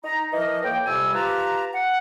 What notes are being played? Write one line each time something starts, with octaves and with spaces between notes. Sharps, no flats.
D#4 A#5
E3 F3 A#4 D#5
A2 A#3 G5
F2 C3 G3 G#5 E6
F4 G4 B4 A5 A#5
F#5